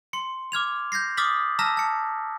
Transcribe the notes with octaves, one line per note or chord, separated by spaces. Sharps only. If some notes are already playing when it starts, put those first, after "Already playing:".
C6 C#7
D6 F6 G#6 F7
G6 G#6 A#6 C7
D6 D#6 F6 A6 B6 F#7
A5 A#5 E6 F6 A#6 B6
A5 C#7